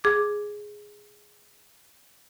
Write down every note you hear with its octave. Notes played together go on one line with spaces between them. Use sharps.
G#4 D6